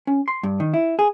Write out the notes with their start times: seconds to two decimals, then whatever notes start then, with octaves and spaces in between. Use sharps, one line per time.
0.07 C#4
0.28 C6
0.43 G2
0.60 D#3
0.74 E4
0.99 G#4